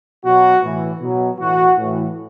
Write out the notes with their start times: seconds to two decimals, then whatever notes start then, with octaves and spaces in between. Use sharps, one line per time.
0.25 B2 F#3 F#4
0.62 A2 E3
1.00 B2 F#3
1.39 A2 E3 F#4
1.77 A2 E3